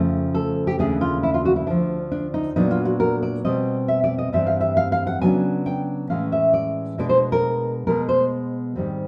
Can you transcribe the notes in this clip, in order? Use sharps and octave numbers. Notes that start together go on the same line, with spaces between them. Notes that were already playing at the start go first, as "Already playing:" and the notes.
Already playing: F2 C#3 F3 A3
A4
G4
D#2 C#3 E3 A3 D4 G#4
F4
E4
F4
F#4
E4
D2 D3 F3 D4
D4
D#4
A#2 F#3 B3 D4 D#4
F4
F#4
A#4
D5
B2 G3 C4 D#5
E5
D5
D#5
G2 E3 G3 C4 E5
F5
E5
F5
F5
F#5
C#3 F#3 B3 D4 G#5
G5
A2 E3 G#3 C#4 F5
E5
D5
B2 G#3 B3 D4 D5
C5
A#4
B2 G#3 B3 A#4
C5
G#2 D#3 G3 C4